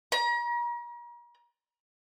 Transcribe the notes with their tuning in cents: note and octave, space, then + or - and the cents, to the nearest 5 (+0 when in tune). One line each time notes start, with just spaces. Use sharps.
A#5 +40